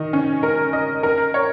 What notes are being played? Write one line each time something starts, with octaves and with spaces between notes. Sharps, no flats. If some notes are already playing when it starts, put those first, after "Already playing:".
Already playing: D#3 D#5
C#4
A#4
D#5
A#4
C#5